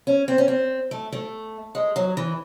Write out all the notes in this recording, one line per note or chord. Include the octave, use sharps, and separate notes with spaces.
C#4
C4
C#4
C4
A3
A3
G#3
F#3
E3